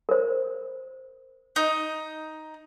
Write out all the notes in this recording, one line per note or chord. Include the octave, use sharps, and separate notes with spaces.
A#4 C5
D#4